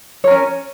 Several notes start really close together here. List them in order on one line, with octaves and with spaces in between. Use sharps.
C#5 A#4 C#4